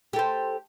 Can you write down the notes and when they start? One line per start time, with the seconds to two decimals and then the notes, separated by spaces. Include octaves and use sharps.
0.13 G4
0.16 A4
0.19 C5